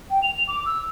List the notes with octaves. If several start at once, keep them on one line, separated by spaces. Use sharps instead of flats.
G5
F7
D6
E6